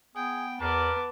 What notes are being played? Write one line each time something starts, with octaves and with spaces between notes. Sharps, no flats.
B3 G#4 G5
E2 B3 A#4 B4 A5 D6